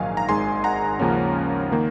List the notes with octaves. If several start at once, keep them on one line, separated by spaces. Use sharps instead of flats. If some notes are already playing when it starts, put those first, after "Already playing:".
Already playing: A#1 G#2 D#3 F#3 F5 G#5
A#5
G#1 G#2 D#3 G#3 G#5 C6
F#5 A#5
D#2 C#3 F3 A#3 C#4
D#3 A#3